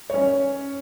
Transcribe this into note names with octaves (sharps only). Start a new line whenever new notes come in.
C#4 C#5